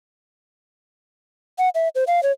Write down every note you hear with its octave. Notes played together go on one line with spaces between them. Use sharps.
F#5
E5
C5
F5
C#5